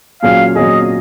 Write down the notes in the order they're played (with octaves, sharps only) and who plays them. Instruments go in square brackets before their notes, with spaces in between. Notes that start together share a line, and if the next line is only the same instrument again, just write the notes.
[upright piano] A#2 F#3 C#4 G#4 [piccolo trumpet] F5
[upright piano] A#2 F#3 C#4 G#4 [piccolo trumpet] D#5